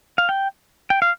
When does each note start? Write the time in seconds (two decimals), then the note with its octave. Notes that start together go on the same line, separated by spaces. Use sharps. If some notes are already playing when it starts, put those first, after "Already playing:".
0.18 F5
0.29 G5
0.90 G5
1.02 F5